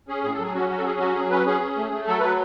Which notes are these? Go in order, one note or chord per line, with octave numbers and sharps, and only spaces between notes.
C#4 G#4
A2 G#4
A4
F#3 G#4
C#4 F#4
F#3 F#4
A4
C#4 G#4
F#3 F#4
F#3 G#4
C#4 B4
C#4 G#4
C#4
A3
A3
F#3 A4
F#3 B4